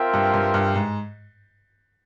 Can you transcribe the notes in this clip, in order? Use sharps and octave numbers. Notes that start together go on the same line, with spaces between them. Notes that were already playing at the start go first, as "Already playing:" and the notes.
Already playing: C4 F4 A#4 E5 G5
G2
G2
G2
G#2